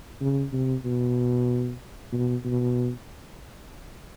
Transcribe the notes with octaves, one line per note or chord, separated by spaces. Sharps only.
C#3
C3
B2
B2
B2